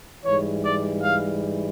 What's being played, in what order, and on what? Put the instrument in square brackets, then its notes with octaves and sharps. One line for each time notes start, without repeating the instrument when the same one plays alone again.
[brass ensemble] G#2 E3 G3 C#5
D5
F5